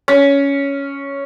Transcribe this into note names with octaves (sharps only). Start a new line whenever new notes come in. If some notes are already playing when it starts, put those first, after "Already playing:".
C#4